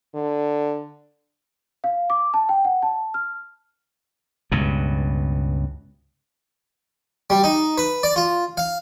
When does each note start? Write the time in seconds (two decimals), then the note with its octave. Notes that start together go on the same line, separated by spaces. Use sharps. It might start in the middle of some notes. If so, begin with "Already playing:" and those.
0.15 D3
1.84 F5
2.10 D6
2.34 A5
2.49 G5
2.65 F#5
2.82 A5
3.14 F6
4.52 C#2 G2 B2
7.30 G3
7.44 D#4
7.78 B4
8.03 D5
8.16 F4
8.57 F5